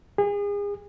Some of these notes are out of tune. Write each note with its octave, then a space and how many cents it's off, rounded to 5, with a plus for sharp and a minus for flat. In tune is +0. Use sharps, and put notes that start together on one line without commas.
G#4 -35